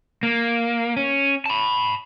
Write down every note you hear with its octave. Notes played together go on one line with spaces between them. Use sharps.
A#3
C#4
A5 B5